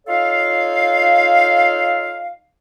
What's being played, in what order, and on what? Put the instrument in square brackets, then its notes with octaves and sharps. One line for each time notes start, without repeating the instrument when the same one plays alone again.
[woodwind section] D#4 F4 A4 C#5 F5